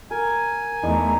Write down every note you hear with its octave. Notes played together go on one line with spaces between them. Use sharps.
A#4 G#5
E2 A3 D#4 E4 D6